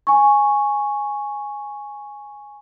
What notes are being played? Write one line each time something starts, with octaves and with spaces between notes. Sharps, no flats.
G#5 C#6